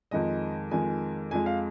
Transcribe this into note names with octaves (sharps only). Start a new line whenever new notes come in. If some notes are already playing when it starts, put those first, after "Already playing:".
F2 D#3 G#3 D#5
F2 D#3 G#3 G#5
F2 F3 G#3 G#5
F5